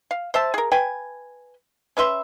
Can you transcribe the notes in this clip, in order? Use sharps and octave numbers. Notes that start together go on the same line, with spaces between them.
F5
C5 E5 A5
G#4 A#4
B4 G5 G#5
C#4 B4 E5 C6